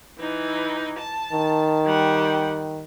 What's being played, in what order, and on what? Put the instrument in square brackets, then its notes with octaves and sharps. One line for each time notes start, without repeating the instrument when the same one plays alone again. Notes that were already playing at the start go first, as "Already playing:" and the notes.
[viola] E3 D#4
A5
[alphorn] D#3
[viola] G3 F#5